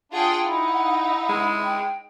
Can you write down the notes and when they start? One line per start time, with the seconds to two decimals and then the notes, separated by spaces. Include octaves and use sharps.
0.12 D4 F4 G#4 F#5 G5
0.46 D#4 E4
1.29 G#3
1.63 G5